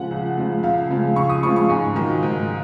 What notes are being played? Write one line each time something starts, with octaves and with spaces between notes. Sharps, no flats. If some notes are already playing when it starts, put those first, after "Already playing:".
Already playing: C#3 F3 G#3 F#5
C#2
C#3 F3 G#3
C#2 F5
C#3 F3 G#3
C#2 C#6
D#6
C#3 F3 G#3 C#6
C#6
G#2 G#5
D#3 F#3
G#2